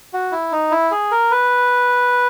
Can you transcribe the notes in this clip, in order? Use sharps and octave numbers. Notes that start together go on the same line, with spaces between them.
F#4
E4
D#4
E4
G#4
A#4
B4